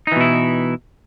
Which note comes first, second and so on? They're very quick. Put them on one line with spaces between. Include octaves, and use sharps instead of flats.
D#4 E3 B2 E4